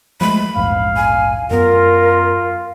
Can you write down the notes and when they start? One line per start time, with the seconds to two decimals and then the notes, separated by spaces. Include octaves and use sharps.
0.21 F3 G#3 A3 B5
0.56 A#1 E2 G#2 F5
0.96 G#5
1.50 F#2 B3 F4 A#4